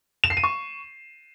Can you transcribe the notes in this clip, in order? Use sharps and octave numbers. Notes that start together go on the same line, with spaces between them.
E7
C7
D#7
C#6